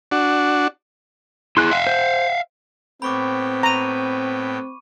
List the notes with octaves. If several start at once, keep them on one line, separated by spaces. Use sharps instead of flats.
D4 F#4
E4 G#4 C6 F#6
E5 F5
C5
A2 B3 C4 G5 B5 C#6 D6
A#5 C#6 D#7